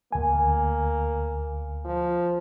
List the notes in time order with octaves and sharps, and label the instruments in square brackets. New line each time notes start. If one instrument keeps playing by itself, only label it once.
[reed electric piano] D2 G#5 [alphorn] A#3
[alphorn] F3